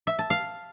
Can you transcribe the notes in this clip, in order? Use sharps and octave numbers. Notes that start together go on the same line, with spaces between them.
E5
A5
F5